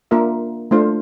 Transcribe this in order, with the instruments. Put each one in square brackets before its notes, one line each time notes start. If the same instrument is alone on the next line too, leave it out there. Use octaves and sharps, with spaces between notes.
[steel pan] A#3 D4 F4 A#4 E5
A3 D4 F4 C5 F5